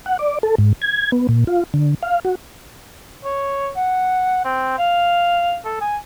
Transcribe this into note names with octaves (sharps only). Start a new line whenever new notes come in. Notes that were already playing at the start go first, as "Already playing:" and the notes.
F#5
D5
A4
G#2
G#6
B3
A#2
F4
D3
F5
F#4
C#5
F#5
C4
F5
A4
G#5